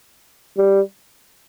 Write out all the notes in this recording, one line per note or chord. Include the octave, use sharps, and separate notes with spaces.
G3